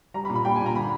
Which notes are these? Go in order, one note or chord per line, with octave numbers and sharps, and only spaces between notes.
G3 A#5
B5
A#2
B5
G3 G5
G#5
A#2
A#5
D3 B5